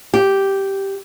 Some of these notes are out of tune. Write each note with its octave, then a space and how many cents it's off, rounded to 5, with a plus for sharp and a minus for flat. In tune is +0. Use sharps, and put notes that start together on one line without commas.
G4 -5